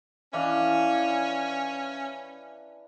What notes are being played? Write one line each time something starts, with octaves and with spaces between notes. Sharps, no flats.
E3 C#4 D4 F5